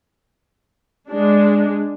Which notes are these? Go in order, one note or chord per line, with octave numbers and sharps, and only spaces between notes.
G#3 D4